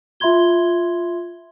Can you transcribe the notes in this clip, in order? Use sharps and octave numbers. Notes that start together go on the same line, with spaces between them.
F4 E5 B5 C6 G#6 G7